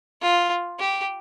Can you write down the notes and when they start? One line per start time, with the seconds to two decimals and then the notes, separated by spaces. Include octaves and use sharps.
0.21 F4
0.79 G4